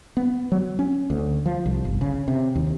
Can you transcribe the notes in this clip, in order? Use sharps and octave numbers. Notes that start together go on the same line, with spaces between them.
B3
F#3
C#4
D2
F3
C2
G1
C#3
C3
D#2